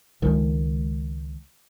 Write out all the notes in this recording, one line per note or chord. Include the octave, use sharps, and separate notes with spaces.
C#2 D#3 F3 G#3